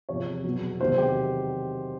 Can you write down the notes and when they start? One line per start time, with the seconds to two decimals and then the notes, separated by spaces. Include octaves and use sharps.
0.09 E2 C3 F3 C#5
0.44 E2 B2 F#3
0.80 E2 C3 D#3 F#3 C5
0.98 G4